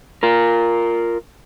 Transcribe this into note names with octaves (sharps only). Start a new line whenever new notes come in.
F4 A#4